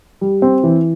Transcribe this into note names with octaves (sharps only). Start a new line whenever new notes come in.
G3
C4
E3